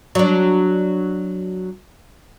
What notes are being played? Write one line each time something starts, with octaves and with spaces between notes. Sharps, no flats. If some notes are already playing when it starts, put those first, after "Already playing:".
F#3 D4